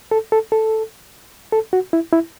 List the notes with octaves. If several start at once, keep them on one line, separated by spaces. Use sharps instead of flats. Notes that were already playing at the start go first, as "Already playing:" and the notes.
A4
A4
A4
A4
F#4
E4
E4